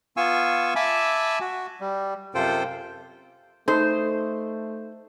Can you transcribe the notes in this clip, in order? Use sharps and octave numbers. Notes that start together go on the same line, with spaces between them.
B3 F4 F5 G#5 C#6 E6
E5 G#5 A5 B5 D6 E6
F#4
G3
F#2 C3 F4 A4 C5 G5
A3 D#4 A4 C5